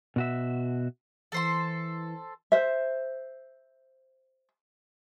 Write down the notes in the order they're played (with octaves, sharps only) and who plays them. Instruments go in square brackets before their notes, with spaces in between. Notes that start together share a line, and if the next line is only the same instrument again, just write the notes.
[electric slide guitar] B2 F#4 E5
[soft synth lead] E3 [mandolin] A4 C5 C6
[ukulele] C5 E5